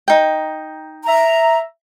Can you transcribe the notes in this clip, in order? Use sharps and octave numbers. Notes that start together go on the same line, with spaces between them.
D#4 G5
E5 A#5